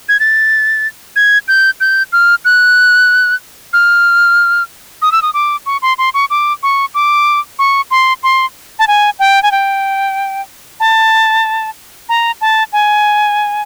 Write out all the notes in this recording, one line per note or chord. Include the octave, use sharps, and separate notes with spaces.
G#6
A6
G#6
G6
G6
F6
F#6
F6
D#6
E6
D#6
D6
C#6
C6
C6
C#6
D6
C#6
D6
C#6
C6
C6
A5
G#5
G5
G#5
G5
A5
A#5
A5
G#5